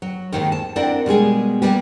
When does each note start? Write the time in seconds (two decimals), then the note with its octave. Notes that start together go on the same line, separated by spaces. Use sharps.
0.02 F#3
0.32 D#2 G#2 D#3
0.52 A5
0.76 C4 D4 E4 A#4 D5 F#5
1.06 B2 G3 G#3 G#4
1.62 G3 A#3 B3 G4